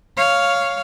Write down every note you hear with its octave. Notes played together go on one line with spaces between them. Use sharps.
C#5 F5